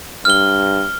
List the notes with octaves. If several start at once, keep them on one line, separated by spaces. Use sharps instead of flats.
G2 F6 G7